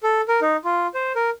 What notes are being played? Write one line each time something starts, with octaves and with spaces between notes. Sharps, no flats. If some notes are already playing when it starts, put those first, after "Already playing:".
A4
A#4
D#4
F4
C5
A#4